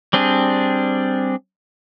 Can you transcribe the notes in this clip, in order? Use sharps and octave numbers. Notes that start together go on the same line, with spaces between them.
G3 C4 D4 G#4